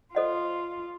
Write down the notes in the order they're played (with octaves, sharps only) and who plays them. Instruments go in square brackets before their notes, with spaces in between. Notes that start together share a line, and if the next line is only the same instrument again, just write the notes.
[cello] F4 [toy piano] A4 C5 D#5 F#5